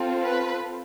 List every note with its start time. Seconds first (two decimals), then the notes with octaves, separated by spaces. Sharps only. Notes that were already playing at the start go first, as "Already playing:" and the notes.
Already playing: C4 F4 A4
0.24 B4